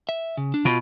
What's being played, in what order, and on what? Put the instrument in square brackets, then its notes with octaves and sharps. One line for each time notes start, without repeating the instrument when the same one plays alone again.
[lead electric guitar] E5
C#3
D4
[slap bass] B2 [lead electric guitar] F4